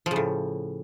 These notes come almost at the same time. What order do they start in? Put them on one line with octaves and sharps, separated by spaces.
F3 C#3 A2